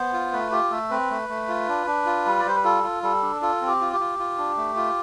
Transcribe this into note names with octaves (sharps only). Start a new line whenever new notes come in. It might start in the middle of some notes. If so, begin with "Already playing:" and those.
Already playing: B3 C5
F4
A3 B4
F4 G4
A3 A4
C4 B4
A3
A3
F4
D4
D4
F4
G3
D5
G3 C5
B4
F4 A4
F4
G3 A4
D4
F4 A4
C4
G4
F4
G4
F4
F4
D4
A3
F4